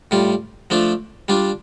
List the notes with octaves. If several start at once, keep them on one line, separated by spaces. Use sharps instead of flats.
A2 G3 F4
F3 A3 D4 F4
G3 D4 F4